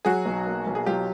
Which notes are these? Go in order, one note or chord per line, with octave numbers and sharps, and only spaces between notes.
F#3 F#4 G#4
B1
A#3
B1
G#4
F#3 F4 G4